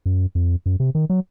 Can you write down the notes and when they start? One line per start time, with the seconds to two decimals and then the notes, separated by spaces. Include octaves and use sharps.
0.06 F#2
0.35 F2
0.66 F#2
0.80 C3
0.95 D#3
1.10 F#3